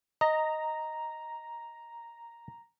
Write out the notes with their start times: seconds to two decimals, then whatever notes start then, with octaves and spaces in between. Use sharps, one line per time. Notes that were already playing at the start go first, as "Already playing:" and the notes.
0.21 D#5 A#5